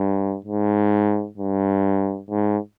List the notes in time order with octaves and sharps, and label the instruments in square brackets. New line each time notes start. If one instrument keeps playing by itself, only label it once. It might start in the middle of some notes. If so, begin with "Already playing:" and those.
Already playing: [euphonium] G2
G#2
G2
G#2